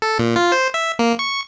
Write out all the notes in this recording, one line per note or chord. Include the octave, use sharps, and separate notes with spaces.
A4
A#2
F4
C5
E5
A#3
C#6